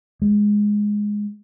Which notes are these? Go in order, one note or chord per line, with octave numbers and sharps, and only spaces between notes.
G#3